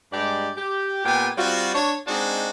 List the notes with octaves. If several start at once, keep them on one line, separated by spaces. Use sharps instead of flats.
G2 G#3 G4 D5
G4
A#2 B3 G4 G5 G#5
G3 C4 F4 F#4
D4 C#5
G#3 C4 D4 D#4 F#4